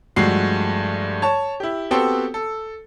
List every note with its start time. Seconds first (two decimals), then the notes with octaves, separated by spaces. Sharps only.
0.16 G2 F3 G#3 A3 F#4 C7
1.22 C#5 A5
1.60 E4 G4
1.91 B3 C4 F#4 G4 A4 C5
2.34 A4